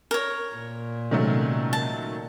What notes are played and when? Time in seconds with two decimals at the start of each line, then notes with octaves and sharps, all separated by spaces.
0.11 A#4 C#5
0.55 A#2
1.11 C3 D#3 F#3 G#3 A3 C#4
1.73 A5